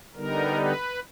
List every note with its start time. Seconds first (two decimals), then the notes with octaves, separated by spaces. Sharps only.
0.16 D3 G3 B3 D#4 A#4
0.57 B4